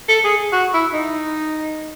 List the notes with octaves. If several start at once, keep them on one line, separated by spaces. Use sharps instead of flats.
A4
G#4
F#4
E4
D#4